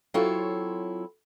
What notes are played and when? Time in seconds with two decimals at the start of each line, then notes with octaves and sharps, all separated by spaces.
0.14 F#3 C4 E4 F4 A4 C#5